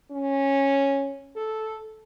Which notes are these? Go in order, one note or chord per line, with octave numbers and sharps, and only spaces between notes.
C#4
A4